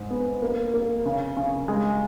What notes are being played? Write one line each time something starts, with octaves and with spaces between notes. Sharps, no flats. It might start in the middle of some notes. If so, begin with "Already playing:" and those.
Already playing: G#2
B3
A#3
A#3
C#3
C#3
G#3